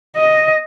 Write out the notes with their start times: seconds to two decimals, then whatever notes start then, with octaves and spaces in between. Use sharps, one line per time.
0.16 D#5